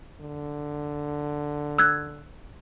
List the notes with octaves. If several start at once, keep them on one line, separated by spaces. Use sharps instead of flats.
D3
E6 F#6 G#6